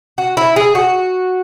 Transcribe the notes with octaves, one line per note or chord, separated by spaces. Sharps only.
F#4
E4
G#4
F#4